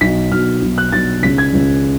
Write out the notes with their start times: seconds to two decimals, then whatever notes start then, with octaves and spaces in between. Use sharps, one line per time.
0.01 B1 B2 B6
0.31 B1 B2 F6
0.62 B1 B2
0.78 F#6
0.92 B1 B2 A6
1.23 C#2 C#3 B6
1.38 G#6
1.53 C#2 C#3